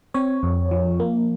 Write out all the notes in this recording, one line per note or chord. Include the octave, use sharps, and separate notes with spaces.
C4 C#5
F2
F3
A#3